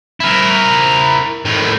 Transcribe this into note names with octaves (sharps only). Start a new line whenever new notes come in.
E4 A#4
A2 D#3